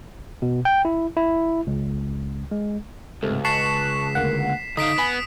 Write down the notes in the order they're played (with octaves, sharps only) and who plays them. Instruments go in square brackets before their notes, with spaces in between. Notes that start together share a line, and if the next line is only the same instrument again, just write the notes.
[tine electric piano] B2
G5
E4
E4
C#2
G#3
[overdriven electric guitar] C#2 [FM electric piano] G#2 C3 A3
[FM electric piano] A5 C#6 F#6 [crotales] B6 C7 E7
[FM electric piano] D2 A#3 F#5
[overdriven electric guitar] D3 F5 [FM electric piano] D#4 [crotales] D#6 B6 D7
[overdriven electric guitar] B3 [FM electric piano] G#5 B5 F#6